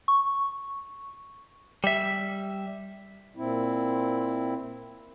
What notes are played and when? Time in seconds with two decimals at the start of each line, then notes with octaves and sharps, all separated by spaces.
0.08 C#6
1.84 G3 E5
3.36 A#2 C4 E4